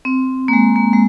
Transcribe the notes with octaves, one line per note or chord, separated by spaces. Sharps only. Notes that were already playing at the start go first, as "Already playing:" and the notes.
C4
A#3
G#3
A#3
G#3